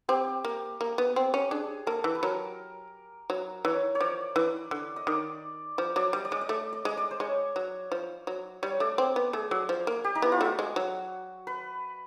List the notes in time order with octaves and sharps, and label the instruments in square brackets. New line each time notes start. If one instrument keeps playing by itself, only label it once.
[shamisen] C4 [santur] G4
[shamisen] A#3
A#3
B3
C4
C#4
[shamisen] D4 [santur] G#4
[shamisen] A#3 [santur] A4
[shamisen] E3
[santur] B4
[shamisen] F#3 [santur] A#4
[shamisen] F#3
[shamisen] E3 [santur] C#5
[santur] C#5
[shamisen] F3 [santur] D5
[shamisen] E3
D3
[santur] D#5
[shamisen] D#3 [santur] D5
[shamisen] F3
[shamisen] F#3 [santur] D5
[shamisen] G3 [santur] D#5
[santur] D5
[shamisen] G#3 [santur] D#5
[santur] D#5
[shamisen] A3 [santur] D5
[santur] D#5
[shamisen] G#3 [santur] D#5
[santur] D5
C5
[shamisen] G#3 [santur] C#5
[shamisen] F#3
F3
F#3
[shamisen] G3 [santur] C#5
[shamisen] A3 [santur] D5
[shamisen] C4
B3
[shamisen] A3 [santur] G#4
[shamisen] F#3
F3
A#3
[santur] G4
D#4
[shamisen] B3 [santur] E4
[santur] F4
[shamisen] A3 [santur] F#4
[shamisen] G#3
F#3
[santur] B4